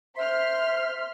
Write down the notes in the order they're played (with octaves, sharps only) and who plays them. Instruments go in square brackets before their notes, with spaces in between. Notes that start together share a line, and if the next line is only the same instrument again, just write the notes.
[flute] C5 [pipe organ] E5 [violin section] C6 F6